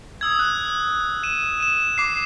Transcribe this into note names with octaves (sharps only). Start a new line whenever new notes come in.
D#6 E6 G#6
F#6
D#7 E7
D#7 E7
D6 C7